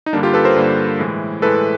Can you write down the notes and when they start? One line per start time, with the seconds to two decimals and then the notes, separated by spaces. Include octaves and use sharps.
0.06 D#4
0.13 G2 D3 G3 A#3 D4
0.23 F4 G4
0.34 A4 B4
0.44 A#4 C5
0.56 G2 D3 G3 A#3
0.99 A2 E3 G#3
1.42 A2 E3 G#3 A4 B4